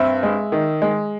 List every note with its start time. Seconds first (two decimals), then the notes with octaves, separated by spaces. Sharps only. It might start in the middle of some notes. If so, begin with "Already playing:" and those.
Already playing: G2 C4 E5
0.23 G#3
0.52 D#3
0.82 G#3